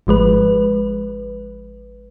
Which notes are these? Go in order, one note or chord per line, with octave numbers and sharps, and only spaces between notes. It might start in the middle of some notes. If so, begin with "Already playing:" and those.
G#1 F3 G#3 B4